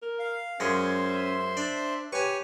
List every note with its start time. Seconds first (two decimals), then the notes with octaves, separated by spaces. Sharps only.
0.02 A#4
0.19 F5
0.60 F#2 G#3 C#4 C5 C#5 E5 C6
1.57 D4 D5
2.13 G4 B4 C#5 G#5 C#6